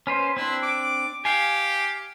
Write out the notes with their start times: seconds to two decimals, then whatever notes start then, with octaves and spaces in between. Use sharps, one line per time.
0.07 C#4 B4 C5
0.37 C4 D4 E4
0.63 D6
1.25 G4 F5 G#5